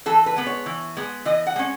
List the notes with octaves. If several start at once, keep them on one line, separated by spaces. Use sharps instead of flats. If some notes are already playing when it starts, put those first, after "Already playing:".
E3 A4
B4
G#3 B3
C#5
E3
G#3 B3
E3 D#5
F#5
G#3 C#4